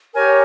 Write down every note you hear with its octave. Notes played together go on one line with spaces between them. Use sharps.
G4 A#4 C#5 G#5